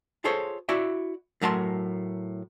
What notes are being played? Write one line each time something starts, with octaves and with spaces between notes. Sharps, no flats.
F4 G#4 A4 C5 C#5
E4 F#4 D5 E5
A2 F#3 A#4 A5 A#5 C6